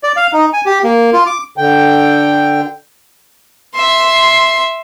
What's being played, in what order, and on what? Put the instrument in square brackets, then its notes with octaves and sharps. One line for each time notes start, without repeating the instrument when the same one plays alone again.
[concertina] D5
F5
D#4
G#5
G4
A#3
F4
D6
[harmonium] D3 G5
[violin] E5 C6